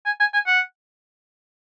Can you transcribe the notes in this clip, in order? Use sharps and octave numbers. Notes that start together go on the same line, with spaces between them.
G#5
G#5
G#5
F#5